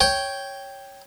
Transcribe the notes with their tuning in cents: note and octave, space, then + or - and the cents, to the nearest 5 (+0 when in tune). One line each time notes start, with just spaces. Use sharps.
C#5 +0 G5 +0